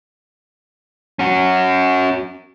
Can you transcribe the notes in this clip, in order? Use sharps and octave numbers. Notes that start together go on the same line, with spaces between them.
C#4 F#4